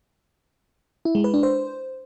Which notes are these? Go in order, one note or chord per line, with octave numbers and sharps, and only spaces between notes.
E4
G#3
B4
D4
C5